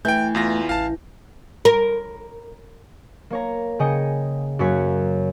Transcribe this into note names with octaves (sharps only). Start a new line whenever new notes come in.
E3 A3 G5 G6
E2 F4 A#6
A1 F5 A5
A#4
A#3 C#5 A#5
C#3 G#4 D#5 G5 C#7
F#2 A#3 F#4 C#5 B6